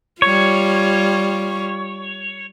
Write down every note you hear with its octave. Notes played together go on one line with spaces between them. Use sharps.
G3 F4 C#5